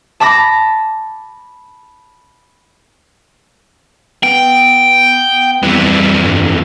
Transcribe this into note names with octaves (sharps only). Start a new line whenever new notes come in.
A5 B5 D6 A#6
B3 G5
F2 E3 G3
G2